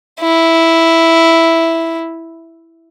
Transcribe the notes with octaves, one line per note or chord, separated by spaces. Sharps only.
E4